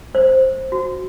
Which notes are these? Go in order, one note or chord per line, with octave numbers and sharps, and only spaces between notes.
C5
F#4